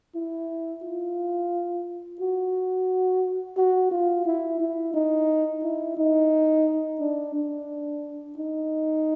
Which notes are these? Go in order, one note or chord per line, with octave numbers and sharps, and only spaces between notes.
E4
F4
F#4
F#4
F4
E4
E4
D#4
E4
D#4
D4
D4
D#4